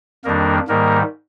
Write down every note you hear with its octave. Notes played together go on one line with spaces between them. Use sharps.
F2 D#3 G3 A#3 D4 A#4
G#2 D#3 G3 A#3 A#4